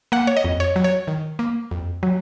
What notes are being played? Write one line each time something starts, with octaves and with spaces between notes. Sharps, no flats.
A#3 F#5
C#5
D#5
F2
C#5
F#3
C#5
D#3
A#3
F2
F#3